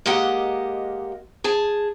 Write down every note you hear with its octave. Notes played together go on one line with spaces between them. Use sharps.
G#3 A#3 G4 D#5 F#5
G#4 A5